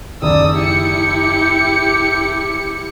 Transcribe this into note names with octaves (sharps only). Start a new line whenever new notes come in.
F#1 D#3 D5 D#6 E6
E4 G4 C#7